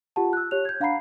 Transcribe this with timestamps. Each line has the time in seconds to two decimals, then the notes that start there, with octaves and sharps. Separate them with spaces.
0.16 F4 G4 F#5 A5
0.33 E6 F#6
0.51 G4 C#5 F#6 F7
0.65 G6 G#6
0.80 D4 F5 F#5 A#5 B5 C7